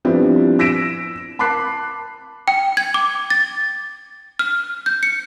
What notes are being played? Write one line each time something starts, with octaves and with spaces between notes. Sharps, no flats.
F3 G3 B3 C4 D4 E4
E6 A#6 B6 D7 E7
A5 B5 D6 F#6 C7
G5
G#6
D6
A6
F6
G6
C#7